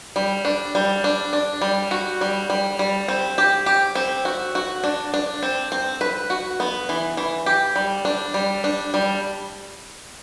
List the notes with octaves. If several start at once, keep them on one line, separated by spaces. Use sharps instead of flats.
G3
D4
G3
D4
D4
G3
F#4
G3
G3
G3
C4
G4
G4
C4
F#4
F#4
D4
D4
C4
C4
B4
F#4
B3
E3
E3
G4
G3
D4
G3
D4
G3